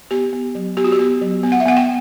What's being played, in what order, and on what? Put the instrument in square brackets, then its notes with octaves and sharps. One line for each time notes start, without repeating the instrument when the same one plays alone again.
[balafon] B3 G4
B3
F#3
B3 G4
F#4
G4
B3
F#3
B3
F#5
E5
B3 F#5
G5